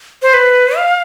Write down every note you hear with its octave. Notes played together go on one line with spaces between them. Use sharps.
C5
B4
F5